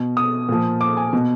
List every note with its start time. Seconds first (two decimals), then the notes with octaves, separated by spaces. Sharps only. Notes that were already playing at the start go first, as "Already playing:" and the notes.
Already playing: B2
0.17 D#6
0.49 A#2 F3
0.81 D6
0.97 G#5
1.13 B2